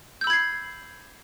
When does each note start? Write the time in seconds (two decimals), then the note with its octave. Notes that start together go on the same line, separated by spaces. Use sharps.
0.21 G6
0.24 E6
0.27 B5
0.30 G#6
0.33 C7